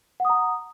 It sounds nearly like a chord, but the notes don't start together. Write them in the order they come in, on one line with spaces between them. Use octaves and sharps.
F#5 D#6 A#5